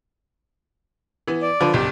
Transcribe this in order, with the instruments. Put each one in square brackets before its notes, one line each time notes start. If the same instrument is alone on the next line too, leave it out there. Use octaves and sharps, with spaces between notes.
[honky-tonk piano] E3 B3
[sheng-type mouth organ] D5
[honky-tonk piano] D3 F3 B4
[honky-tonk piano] F#1 B1 G4 [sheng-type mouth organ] D4 D5